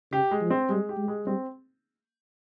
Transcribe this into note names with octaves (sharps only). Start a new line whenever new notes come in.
C#3 G4
G#3
F3
C4
G3 G#3
G4
G#3
G#3
G3 C4